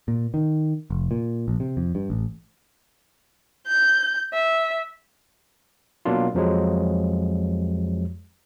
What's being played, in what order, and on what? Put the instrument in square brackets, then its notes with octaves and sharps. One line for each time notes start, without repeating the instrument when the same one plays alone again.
[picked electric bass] A#2
D#3
F1
A#2
A#1
C3
F2
G2
A1
[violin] G6
E5
[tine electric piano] B2 F#3 A#3 D4 F4
F2 F3 F#3 G#3